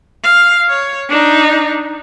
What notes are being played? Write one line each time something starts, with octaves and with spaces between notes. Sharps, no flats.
F5
C#5
D4 D#4